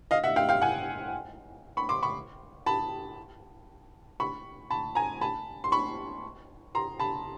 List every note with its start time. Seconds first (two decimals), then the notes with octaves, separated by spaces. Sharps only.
0.11 D#5 F5
0.24 E5 F#5
0.36 F5 G5
0.49 F5 G5
0.62 F#5 G#5
1.77 B5 C#6
1.89 C6 D6
2.03 B5 C#6
2.66 A5 B5
4.20 B5 C#6
4.71 A5 B5
4.95 G#5 A#5
5.21 A5 B5
5.64 C6
5.72 B5 C#6
6.75 A#5 C6
7.00 A5 B5